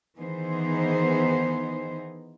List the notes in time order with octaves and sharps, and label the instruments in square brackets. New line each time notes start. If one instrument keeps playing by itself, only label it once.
[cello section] D#3 E3 B3 D#4 G#4 C5